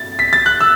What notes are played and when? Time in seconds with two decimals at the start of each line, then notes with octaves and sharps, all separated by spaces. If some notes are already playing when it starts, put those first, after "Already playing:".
Already playing: A6
0.19 B6
0.33 A6
0.46 F#6
0.61 E6